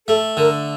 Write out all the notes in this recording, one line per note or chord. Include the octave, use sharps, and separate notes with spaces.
A3 A4
D3 A#4